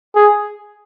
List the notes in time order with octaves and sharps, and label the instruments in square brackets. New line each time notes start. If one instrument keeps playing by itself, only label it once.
[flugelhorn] G#4